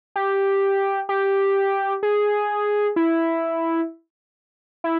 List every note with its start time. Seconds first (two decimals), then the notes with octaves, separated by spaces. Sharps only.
0.16 G4
1.09 G4
2.03 G#4
2.96 E4
4.84 E4